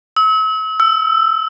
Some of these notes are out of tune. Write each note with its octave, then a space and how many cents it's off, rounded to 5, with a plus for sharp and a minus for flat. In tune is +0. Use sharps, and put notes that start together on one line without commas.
E6 -40
E6 +15